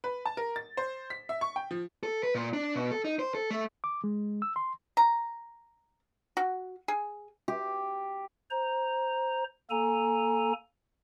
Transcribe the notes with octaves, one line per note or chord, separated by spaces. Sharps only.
B4
A5
A#4
A6
C5
B6
E5
C#6
G5
F3
A4
B4
A#2
D4
B2
A4
D#4
C5
A4
A3
D6
G#3
E6
C6
A#5
F#4
G#4
G4
C5 A#5
A#3 A4 G#5 A#5